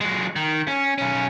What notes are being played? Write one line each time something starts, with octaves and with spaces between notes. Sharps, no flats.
F#3 G#3
D#3
C#4
B1 C#4